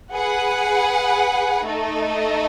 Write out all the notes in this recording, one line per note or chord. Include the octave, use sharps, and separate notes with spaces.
G#4 B4 F#5
A3 D#4 A4 D#5